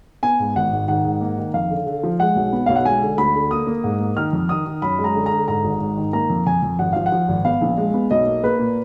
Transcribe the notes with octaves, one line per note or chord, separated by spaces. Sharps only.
B3 G#5
G#2
G#1 F#5
G#2
D#3 F#5
G#2
A#3
D#3
F2 F5
D3
D3
F3
G#3 F#5
B1
B3
B1 F5
F#5
G#3 G#5
D3
D2 B5
D3
A#3 D#6
A#3
G#2
A#3
D#3 F6
F2
D#3 D#6
D#3
F#2 B5
G#3
A#5
D3
A#5
D3
G#2 A#5
G#1
G#2
D#3
A#3 A#5
F2
F2 G#5
F2
G#1 F#5
F3 F5
F#5
F3
G#1
B3 F5
A#1
G#3
B3
B1 D#5
A#3
A#3 B4
A#2